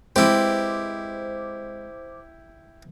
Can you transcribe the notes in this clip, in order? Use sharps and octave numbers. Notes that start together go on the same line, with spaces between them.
G#3 C4 E4 G4 B4 C5 D6